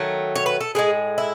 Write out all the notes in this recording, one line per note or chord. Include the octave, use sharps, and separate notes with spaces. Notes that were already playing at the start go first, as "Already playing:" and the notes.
Already playing: D#3 F#3 A3
C#5
B4
A4
A2 E3 G#3 G#4
E4